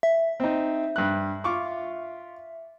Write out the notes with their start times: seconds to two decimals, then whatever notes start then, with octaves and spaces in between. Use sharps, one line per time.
0.03 E5
0.40 C4 D#4
0.96 G2 F#6
1.44 F4 C#6 D6